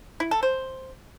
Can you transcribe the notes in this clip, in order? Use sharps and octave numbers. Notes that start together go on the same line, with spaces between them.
E4
A4
C5